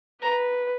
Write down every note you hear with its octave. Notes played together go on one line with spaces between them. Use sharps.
B4 A#5